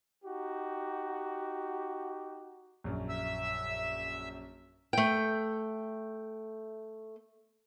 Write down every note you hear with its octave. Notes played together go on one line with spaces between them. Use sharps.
D#4 F#4 G4
A#1 F#2
E5 E6
A3 G5